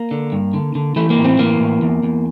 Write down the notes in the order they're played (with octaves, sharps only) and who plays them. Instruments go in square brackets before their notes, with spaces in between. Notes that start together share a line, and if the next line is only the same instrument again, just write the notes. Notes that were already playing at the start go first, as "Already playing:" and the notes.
Already playing: [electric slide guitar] A#3
D3
G2
D3
D3
E3 A3
A#3
A2
C4
E3 A#3
A2
E2
E2